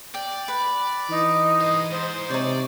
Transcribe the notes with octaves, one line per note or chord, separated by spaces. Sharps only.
D5 G5
B4
E3 D#4
C5 D#5
G#2 C5
C3 D#4 C#5 D5